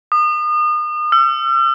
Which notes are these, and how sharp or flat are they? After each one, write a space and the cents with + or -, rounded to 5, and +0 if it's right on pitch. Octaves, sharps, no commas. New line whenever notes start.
D#6 -35
E6 +45